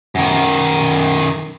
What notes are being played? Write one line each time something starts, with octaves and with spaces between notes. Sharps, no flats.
F#2 D#3